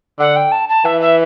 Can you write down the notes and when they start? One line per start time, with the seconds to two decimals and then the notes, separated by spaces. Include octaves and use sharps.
0.19 D3 F#5
0.36 G5
0.51 A5
0.69 A5
0.85 E3 E5
1.01 E5